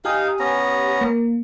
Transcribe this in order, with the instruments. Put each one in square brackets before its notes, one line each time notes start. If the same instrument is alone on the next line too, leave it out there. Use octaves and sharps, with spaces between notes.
[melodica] D#4 F5 [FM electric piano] G4 G#5 D#6
[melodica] B3 C#4 A#5
[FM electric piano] A#3